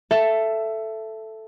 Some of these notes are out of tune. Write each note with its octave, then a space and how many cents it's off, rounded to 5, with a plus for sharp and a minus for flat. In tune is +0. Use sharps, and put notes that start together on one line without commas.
A4 +0 E5 +15